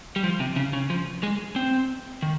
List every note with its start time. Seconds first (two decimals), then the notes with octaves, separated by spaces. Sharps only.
0.16 G3
0.24 F3
0.40 C3
0.56 C#3
0.73 C#3
0.90 F3
1.23 G#3
1.56 C4
2.22 D#3